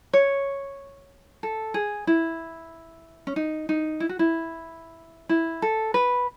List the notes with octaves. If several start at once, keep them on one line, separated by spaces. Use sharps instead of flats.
C#5
A4
G#4
E4
C#4
D#4
D#4
E4
F#4
E4
E4
A4
B4